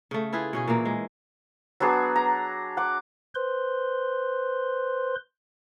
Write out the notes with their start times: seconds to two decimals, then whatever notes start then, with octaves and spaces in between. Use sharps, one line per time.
0.11 C#3 A3
0.33 E4 F4 G#4 B4
0.53 B2 C#4 G#4
0.68 A#2 E3 A#3
0.85 G#3
1.80 F#3 B3 D4 G#4
2.16 A#5
2.77 F#5 D6
3.35 B4 C5 C6